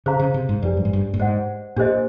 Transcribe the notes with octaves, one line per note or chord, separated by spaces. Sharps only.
C#3 G#4 C5 F5 A#5
C#3
C3
G#2
F2 D4 G4 B4 D5
G2
G#2
G2
A2
G#2 C5 D#5 F#5
A#2 D4 G4 C5 D#5